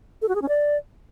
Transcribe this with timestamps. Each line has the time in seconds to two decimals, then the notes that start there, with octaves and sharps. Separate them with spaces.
0.22 A4
0.28 F#4
0.35 G#4
0.42 C#4
0.49 D5